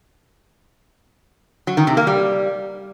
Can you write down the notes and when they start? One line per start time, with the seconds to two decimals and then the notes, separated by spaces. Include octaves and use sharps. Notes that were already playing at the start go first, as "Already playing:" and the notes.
1.67 F#3
1.77 D#3
1.87 C3
1.97 A#3
2.07 G3